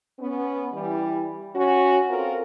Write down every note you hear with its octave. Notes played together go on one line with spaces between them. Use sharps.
B3 C#4
E3 G3
C#4 F#4
C4 F4 A4 A#4